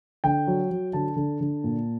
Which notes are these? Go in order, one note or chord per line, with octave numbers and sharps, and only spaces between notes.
D3 G5
F#3
F#3
D3 A5
D3
D3
A#2